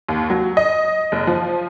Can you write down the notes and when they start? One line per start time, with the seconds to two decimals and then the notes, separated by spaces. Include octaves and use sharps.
0.08 D#2
0.30 F#3
0.57 D#5
1.12 F#1
1.27 F3